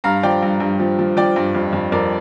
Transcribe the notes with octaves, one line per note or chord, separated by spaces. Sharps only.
G2 F5 A#5
F3 D5 G5
G2
G2
F3
F3
F3 D5 G5
G2
F2
F2
F2 A#4 D5